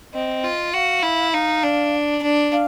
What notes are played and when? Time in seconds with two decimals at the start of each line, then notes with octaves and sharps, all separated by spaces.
0.14 C4 D#5
0.44 F4
0.74 F#4 F5
1.03 E4
1.33 D#4 F5
1.63 D4
2.22 D4
2.52 F5